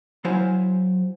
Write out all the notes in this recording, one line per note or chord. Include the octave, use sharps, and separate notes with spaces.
F#3 E4 C5 F5 G#5